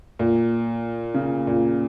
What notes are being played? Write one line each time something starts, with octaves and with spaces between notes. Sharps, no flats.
A#2
C#3
A#2